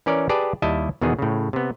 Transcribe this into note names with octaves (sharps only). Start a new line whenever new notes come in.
E3 C#4 A#4 D5
G4 G#4 B4 D5 A5
D#2 G3 E4 D#5 E5 A5
E2 B2 D#3 B3 G#4
A2 C#3
C3 B3